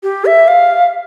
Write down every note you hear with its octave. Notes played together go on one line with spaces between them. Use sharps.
G4
E5
F5